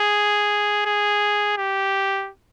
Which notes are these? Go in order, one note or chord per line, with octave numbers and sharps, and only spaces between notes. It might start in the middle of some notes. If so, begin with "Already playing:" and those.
Already playing: G#4
G#4
G4